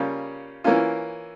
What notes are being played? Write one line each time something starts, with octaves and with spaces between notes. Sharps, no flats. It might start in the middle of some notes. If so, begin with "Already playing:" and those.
Already playing: C#3 G3 A#3 C#4 F4
E3 A#3 C#4 F4